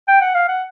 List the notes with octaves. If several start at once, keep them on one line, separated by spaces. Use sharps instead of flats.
G5
F#5
F5
F#5